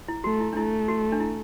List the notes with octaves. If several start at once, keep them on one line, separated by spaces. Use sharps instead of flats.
E4
A3 F#4
E4
D4
A3 E4
F#4
D4
E4